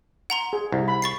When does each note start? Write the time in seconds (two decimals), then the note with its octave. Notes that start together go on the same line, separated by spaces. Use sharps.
0.30 F#5 A#5 C6
0.53 G#4
0.72 C2
0.88 B5
1.02 C#6 A6 C7